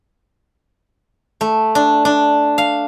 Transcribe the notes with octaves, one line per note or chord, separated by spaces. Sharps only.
A3
D4
D4
F5